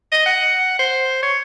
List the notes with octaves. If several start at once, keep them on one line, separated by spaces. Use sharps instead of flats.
D#5
F#5
C5
C#5